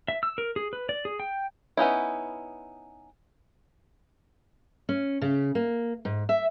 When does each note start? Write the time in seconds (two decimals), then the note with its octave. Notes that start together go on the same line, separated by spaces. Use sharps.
0.08 E5
0.23 E6
0.38 A#4
0.56 G#4
0.73 B4
0.89 D5
1.05 G#4
1.20 G5
1.77 B3 C#4 D#4 E4
4.89 C#4
5.21 C#3
5.55 A#3
6.05 G#2
6.29 E5